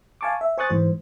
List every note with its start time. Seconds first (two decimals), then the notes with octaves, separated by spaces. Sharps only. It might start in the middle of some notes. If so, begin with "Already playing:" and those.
0.21 F5 G#5 A5 C#6 D6
0.41 E5
0.58 C5 G#5 C#6 D#6 F#6 A6
0.70 G#2 E3 C5